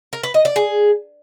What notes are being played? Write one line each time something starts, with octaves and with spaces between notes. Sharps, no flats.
A#4
B4
D#5
D5
G#4